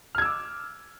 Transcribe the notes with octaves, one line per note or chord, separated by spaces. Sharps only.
D6 E6 F6 G#6